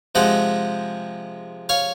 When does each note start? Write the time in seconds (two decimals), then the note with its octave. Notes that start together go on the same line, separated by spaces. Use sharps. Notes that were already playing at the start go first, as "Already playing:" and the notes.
0.15 C3 F3 G#3 D#5 F#5
1.69 C#5 F5